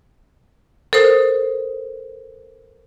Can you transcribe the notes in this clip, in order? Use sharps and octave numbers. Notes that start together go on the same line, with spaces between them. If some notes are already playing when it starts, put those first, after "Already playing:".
A4 A#4 C5 D#6